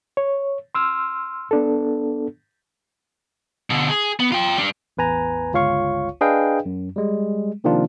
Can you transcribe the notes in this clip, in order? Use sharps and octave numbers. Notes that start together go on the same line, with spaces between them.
C#5
C6 E6 F6
B3 D4 A4
B2 D3
G#4
B3
F4 G5
G3 D4
A1 E2 B4 G#5 A#5
G1 C#2 F4 C#5 F5 C#6
D4 G#4 B4 D#5 F5 G5
F#2
G3 G#3
C3 D#3 F3 A#3 D4 F4